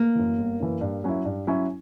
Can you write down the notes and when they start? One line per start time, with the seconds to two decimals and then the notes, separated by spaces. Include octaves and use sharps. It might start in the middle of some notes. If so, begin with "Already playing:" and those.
Already playing: A#3
0.15 F#2 E3
0.38 G1
0.60 F#2 E3
0.81 G2
1.04 F#3 C#4 E4
1.25 G2
1.47 F#3 C#4 E4